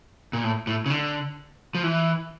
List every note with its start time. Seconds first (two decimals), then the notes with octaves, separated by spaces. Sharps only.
0.33 A#2
0.44 A2
0.67 A2
0.86 C#3
0.90 D3
1.75 F3
1.83 E3